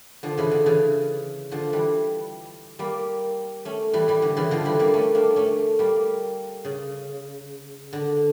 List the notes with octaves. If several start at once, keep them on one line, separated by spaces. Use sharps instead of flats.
D3 F3
C#3 E3
D3
C#3 E3
D3 F3
E3 G3
G3 A#3
A3 C#4
E3 G3
E3 G3
D3
C#3 E3
D3 F3
E3 G3
G3 A#3
A3 C#4
A#3 D4
A3 C#4
G3 A#3
C#3
D3